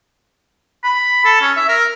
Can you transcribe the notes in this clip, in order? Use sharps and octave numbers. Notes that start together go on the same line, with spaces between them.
B5
A4
C#4
E5
A#4